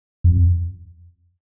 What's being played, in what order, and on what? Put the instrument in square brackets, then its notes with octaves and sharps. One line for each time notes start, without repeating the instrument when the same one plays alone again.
[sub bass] F2